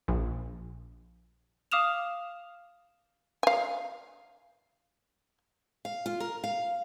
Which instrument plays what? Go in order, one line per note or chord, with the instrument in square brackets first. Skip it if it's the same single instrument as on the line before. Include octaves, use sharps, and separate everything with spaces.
[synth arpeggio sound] A#1
[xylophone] F5 D6 D#6 F6 E7 F7
[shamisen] F5 G#5
[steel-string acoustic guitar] F5
F4
A#4
F5